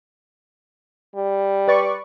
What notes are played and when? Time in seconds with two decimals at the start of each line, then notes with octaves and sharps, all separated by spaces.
1.16 G3
1.68 B4 D5 C#6